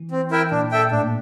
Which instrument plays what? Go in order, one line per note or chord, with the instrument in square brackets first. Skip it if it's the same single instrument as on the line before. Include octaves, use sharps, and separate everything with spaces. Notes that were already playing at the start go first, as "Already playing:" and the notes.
Already playing: [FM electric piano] E3
[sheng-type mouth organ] C4
E4 A#4 E5 G5
[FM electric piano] A#2 [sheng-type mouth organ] D4
[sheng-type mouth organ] A4 E5 G5
[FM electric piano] A2 [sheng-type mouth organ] D4
[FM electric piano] A#2